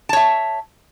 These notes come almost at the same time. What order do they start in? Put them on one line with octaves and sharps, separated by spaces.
A5 C#5 E5